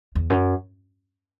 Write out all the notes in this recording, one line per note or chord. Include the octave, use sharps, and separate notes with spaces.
E2
F#2